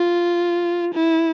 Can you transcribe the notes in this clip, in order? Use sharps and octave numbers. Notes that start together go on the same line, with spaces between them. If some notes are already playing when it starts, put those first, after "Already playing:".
Already playing: F4
E4